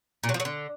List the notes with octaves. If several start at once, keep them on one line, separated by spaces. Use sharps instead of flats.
A#2
F#3
F3
F#3
D3